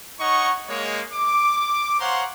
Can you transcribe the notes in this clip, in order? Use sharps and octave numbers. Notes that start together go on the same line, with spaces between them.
D#4 C#5 D#5 F#5 C#6
G#3 A#3 C#5
D6
C5 C#5 F5 F#5 A#5 C6